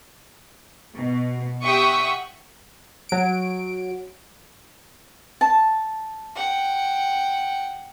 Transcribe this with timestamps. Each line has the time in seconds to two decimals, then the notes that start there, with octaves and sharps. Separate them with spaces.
0.97 B2
1.64 G4 E5 F#5 G5 C#6 D#6
3.09 F#3 D7
5.41 A5
6.36 F#5 G5